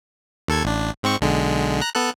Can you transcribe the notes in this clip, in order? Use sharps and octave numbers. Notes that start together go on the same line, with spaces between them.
D#2 A4 G#6
A1 D4
G#2 C4 C#6
B1 D3 G#3
A#5 F#6
B3 A4 F#6